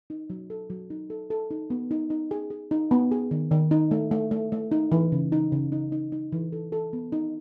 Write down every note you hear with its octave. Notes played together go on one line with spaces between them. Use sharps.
D#4
F#3
A4
F#3
D#4
A4
A4
D#4
B3
D#4
D#4
G#4
G#4
D#4
B3
G#4
D#3
D#3
D#4
A3
A3
A3
A3
D#4
E3
C#3
D#4
C#3
D#4
D#4
D#4
E3
A4
A4
B3
D#4